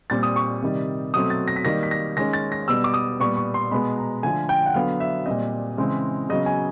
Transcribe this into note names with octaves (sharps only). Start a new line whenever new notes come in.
A#2 G3 C4 A6
D#6
C#6
C3 D#3 G3
B2 F#3 A3 C4 D#6
A6
A#6
B6
D#3 G3 A#3 A#6
B6
A#6
D#3 G#3 C#4 A#6
A6
A#6
B2 G3 B3 E6
D6
D#6
A#2 G3 B3 C#6
C#6
C6
B2 G#3 B3 B5
A#5
D3 F3 A3 G#5
G5
F#5
D3 F#3 B3 F5
E5
A#2 G3 C4 D#5
C#3 E3 G#3 C4
C#3 F#3 B3 D#5
G#5